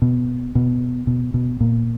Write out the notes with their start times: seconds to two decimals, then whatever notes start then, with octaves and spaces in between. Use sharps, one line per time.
0.02 B2
0.55 B2
1.07 B2
1.34 B2
1.61 A#2